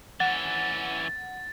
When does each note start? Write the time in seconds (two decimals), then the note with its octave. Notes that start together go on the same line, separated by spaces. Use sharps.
0.20 E3 C#4 F#5 A6